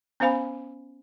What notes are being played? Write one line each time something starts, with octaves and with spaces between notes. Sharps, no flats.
B3 C#4 C5 F5 G#5 B5